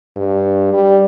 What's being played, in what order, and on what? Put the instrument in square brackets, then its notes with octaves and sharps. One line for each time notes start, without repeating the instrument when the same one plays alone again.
[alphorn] G2
G3